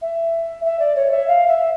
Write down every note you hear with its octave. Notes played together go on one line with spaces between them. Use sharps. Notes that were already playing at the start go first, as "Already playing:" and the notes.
E5
E5
D5
C#5
E5
F5
E5